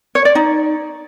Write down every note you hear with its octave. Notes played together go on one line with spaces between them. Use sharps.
C#5
D5
D#4